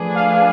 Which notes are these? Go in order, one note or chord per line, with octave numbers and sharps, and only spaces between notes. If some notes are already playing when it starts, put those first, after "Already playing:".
Already playing: F3 A3 D4 G#4 B4
F5